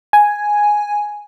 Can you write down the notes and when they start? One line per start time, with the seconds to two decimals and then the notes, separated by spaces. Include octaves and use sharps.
0.13 G#5